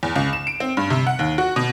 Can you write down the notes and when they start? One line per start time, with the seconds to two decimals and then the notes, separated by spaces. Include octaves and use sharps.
0.03 E2
0.16 C#2
0.33 E7
0.47 D7
0.60 C4
0.77 G2
0.90 C3
1.07 F#5
1.19 D#2
1.38 F#4
1.56 B2